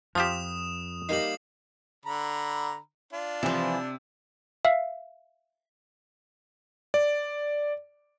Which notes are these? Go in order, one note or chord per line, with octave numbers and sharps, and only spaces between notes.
F2 F3 F4 G4 D#6 E7
G3 A#3 D#4 C7 F#7
D3 A#5 B5
D4 F4
C3 E3 F3
E5 F5
D5